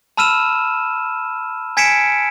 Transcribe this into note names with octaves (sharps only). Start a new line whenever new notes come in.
A5 B5 E6 F6 D#7 E7
G#5 G#6 B6 C#7 D7 E7